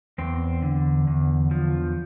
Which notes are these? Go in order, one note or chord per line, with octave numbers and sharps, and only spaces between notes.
E2 C4
D3
E2
F3